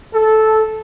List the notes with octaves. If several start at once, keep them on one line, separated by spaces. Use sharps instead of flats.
A4